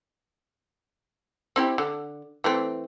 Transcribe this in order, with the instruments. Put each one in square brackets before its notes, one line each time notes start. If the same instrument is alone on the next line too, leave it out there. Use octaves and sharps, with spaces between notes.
[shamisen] C4 E4 G4
D3
E3 A3 C4